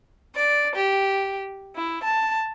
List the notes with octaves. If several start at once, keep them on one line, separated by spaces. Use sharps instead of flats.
D5
G4
E4
A5